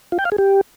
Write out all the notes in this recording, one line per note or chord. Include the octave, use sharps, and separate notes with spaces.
F4
G5
F5
G#4
G4